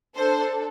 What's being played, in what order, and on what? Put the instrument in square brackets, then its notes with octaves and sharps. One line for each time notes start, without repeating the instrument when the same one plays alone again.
[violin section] D4 A4 C5